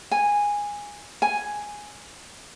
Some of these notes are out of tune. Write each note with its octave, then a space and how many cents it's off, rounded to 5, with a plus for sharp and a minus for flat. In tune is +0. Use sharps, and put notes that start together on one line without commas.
G#5 -10
G#5 +0